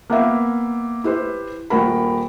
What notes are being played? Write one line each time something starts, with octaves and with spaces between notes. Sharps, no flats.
A#3 B3 E5 F5
E4 G4 B4 C5
D#1 F#4 A#4 B5